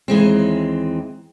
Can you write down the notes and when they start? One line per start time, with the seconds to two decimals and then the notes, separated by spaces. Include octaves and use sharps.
0.08 D#2 E3 G#3 C4